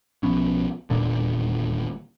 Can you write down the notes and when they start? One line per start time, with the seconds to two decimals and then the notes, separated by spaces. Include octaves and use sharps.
0.23 B1 F3 B3 C#4
0.90 D#1 E2 A#2 D3